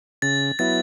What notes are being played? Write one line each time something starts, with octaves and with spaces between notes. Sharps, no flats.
C#3 A6
F#3 B3 E4 A6